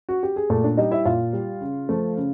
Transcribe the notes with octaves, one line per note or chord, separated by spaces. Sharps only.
F#4
G4
G#4
A#2 A3 A4
D4 D5
G3 D#4 D#5
E4 E5
A#2 F4 F5
G3
C#3
F3 A3
C#3